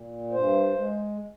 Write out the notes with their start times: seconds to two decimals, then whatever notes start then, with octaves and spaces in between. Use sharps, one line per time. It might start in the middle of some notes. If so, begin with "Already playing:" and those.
Already playing: A#2
0.32 G2 C5
0.76 G#3